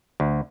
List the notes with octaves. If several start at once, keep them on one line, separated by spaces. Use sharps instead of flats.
D2